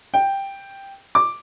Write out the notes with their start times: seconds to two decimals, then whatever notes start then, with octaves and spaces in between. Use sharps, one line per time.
0.14 G5
1.15 D6